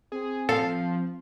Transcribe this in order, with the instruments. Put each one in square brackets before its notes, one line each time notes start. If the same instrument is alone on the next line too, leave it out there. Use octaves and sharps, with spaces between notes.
[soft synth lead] C4 [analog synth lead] G#4
[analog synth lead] F3 [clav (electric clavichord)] A4 [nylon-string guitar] F5